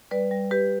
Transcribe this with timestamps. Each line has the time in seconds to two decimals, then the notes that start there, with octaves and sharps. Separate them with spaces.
0.11 G3 B4 D5
0.31 G3
0.51 G3 G4 B4